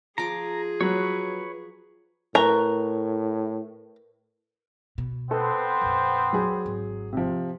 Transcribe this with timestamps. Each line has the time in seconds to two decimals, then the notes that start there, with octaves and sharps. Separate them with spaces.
0.18 F3 F4 G#4 A#5 D6
0.81 F#3 B4 C#5
2.35 A2 A#4 B4 A#5 C#6
4.98 B2
5.31 B3 C4 A4 B4 C5
5.81 A#1 F2
6.33 F#3 G#4
6.66 G#1
7.13 C3 F3